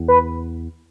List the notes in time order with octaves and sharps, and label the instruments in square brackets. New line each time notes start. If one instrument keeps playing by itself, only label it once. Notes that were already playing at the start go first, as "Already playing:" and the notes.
Already playing: [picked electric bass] E2
[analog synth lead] B4